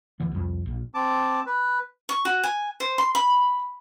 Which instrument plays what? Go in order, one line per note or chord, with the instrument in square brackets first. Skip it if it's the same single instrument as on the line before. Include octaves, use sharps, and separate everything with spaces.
[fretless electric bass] D2 E3 B3
C2 F2
A#1
[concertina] C4 A5 D6
B4
[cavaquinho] C#6
F#4
G#5
C5
C6
B5